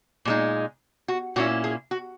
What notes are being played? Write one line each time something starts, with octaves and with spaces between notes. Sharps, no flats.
A#2 G#3 D#4
F#4
A#2 A#3 C#4 E4 F#4
G#4
F#4